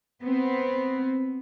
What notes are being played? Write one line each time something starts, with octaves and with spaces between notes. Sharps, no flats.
B3 C4